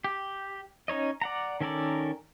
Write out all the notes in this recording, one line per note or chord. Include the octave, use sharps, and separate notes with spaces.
G4
C#4 D#4 C#5 D#5
D5 F#5 A#5
D#3 C#4 A4 A#4 D5